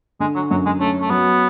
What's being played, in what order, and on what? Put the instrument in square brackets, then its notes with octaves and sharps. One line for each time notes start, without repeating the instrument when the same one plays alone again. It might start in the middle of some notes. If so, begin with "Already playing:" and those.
[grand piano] D3 [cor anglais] G#3
[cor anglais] F#3
[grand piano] F#2 [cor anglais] F#3
[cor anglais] G#3
[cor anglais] A3 [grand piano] C#4
[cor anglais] A3
[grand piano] F#3 [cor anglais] B3